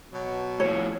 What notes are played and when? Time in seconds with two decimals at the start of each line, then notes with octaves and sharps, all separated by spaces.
0.13 B2 F#3
0.60 A2 E3 F3 C#5